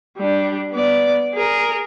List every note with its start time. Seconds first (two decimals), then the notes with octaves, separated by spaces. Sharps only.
0.18 G3 D4
0.72 B3 D5
1.34 G#4 A#4